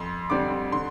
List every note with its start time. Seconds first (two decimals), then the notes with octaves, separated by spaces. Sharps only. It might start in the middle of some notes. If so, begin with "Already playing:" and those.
Already playing: F2 C6
0.30 D3 G3 C4 D6
0.72 D3 C6